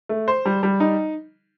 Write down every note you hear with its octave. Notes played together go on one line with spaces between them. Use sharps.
A3
C5
G3
G3
D#4